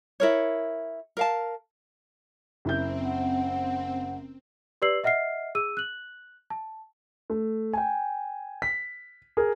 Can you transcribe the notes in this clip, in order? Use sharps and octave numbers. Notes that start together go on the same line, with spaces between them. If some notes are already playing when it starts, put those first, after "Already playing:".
E4 A#4 C#5
A#4 F5 A5
F#1 C4 E4 G6
F#5
G4 B4 D5 E6 C7 F#7
D#5 E5 F#5 F6 C7
G#4 E6 D#7
F#6 F#7
A5
A3
G5 G#5
B6
G#4 A#4